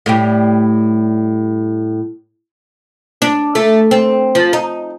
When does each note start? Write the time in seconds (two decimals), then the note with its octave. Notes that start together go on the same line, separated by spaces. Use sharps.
0.06 A2 G3 G4
3.22 D4
3.55 A3
3.91 C4
4.35 F3
4.53 D#4